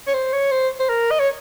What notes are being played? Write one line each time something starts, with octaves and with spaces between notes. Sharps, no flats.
C#5
C5
C#5
C5
C5
A#4
D#5
C#5